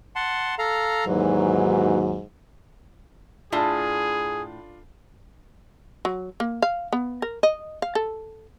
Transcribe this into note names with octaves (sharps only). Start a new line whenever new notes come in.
F#5 A5 C6
A4 F5 A#5
D#2 G#2 E3 F#3
A2 D4 F4 G#4 G7
F#3
A#3
F5
B3
A#4
D#5
F5
A4